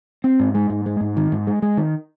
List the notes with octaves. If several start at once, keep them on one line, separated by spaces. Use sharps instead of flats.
C4
G#2
G#3
G#2
G#3
G#2
D#3
G#2
G#3
G#3
D#3